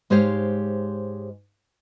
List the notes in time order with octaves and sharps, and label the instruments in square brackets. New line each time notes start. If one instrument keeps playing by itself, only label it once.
[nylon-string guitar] G#2 G#3 G4 C5 C#5 F5